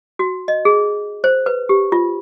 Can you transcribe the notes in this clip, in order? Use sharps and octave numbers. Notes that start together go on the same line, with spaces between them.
F#4
D#5
G#4
C5
B4
G4
F4